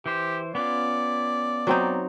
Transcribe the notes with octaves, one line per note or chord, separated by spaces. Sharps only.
E3 G4 C5
B3 C#4 F4 D5
F#3 C4 D#4